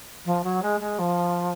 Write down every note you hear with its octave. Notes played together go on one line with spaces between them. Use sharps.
F3
F#3
G#3
G#3
F3